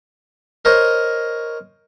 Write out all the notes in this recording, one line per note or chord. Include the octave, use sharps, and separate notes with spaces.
A#4 C5 C#5 D#5